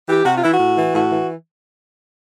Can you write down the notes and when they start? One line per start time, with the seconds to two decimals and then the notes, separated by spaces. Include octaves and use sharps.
0.08 E3 G4
0.25 C3 F#4
0.34 F4
0.42 E3 E4
0.51 F#4
0.59 A2
0.76 E3
0.94 A2 F#4
1.11 E3